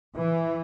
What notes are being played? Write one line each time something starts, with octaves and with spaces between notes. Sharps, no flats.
E3